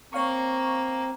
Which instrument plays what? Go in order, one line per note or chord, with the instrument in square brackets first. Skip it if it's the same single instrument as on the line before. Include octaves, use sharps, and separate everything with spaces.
[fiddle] A#3 [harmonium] C4 [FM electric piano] C#5 F5 C#6